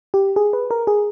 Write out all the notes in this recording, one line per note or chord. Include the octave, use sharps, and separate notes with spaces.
G4
G#4
B4
A#4
G#4